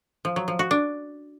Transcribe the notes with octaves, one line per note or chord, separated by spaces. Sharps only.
F3
F#3
F3
F#4
D4